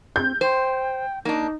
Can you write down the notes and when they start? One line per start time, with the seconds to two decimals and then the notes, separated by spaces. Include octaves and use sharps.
0.16 C4 G6
0.41 C5 G5
1.25 A#3 D4 D#4